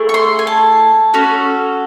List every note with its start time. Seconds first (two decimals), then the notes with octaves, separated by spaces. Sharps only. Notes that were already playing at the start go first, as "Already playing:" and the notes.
Already playing: A3 E4 G#4
0.09 C#6
0.14 C6
0.39 G#5
0.47 A5
1.14 C#4 F#4 A4